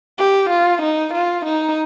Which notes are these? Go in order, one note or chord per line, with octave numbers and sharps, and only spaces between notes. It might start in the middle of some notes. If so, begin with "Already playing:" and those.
G4
F4
D#4
F4
D#4